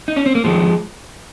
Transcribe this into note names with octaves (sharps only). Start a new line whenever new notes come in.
D#4
C#4
C4
A#3
F2 C3 D#3 F3 G#3